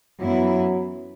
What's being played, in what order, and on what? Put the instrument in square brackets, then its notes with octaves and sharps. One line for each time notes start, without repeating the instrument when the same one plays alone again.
[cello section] F#2 E3 B3 E4 [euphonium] F#3